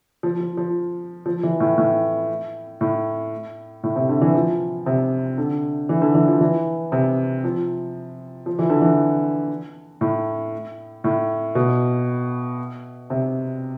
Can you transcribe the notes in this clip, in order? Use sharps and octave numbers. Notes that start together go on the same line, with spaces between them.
F3
F3
F3
F3
E3
A2
A2
A2
A2
C3
D3
E3
F3
C3
D3
E3
D3
E3
F3
E3
C3
F3
F3
E3
D3
E3
A2
A2
B2
C3